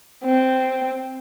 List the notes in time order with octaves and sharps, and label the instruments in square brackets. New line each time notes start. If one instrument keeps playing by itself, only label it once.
[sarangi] C4